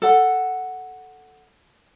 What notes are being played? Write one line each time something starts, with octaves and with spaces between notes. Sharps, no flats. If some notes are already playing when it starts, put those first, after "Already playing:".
A4 F#5